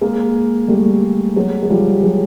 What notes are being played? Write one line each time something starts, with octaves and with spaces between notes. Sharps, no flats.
G#3 A#3
G3 A3
F#3 G#3
G#3
F3 G3
F#3 G#3